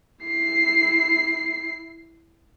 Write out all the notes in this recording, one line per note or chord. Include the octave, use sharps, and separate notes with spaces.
E4 C7